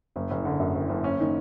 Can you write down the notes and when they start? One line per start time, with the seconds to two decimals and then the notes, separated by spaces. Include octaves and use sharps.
0.16 F#1
0.31 F#1
0.45 D3
0.60 F#2
0.75 F#1
0.89 F#1
1.04 C#4
1.20 D#3